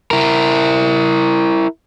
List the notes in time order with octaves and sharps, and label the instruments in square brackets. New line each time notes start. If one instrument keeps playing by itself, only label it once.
[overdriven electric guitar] E4 A#4